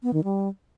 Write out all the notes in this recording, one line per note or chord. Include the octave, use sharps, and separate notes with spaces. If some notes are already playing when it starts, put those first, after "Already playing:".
B3
D#3
G3